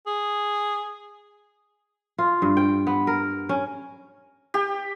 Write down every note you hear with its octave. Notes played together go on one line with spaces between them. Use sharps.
G#4
F4
G2
G5
B3
A#4
C#4
G4